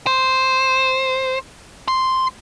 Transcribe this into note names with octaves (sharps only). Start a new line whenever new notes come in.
C5
C6